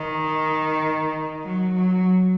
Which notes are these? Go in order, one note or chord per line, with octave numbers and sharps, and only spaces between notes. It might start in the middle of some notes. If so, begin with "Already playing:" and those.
Already playing: D#3
F#3
F#3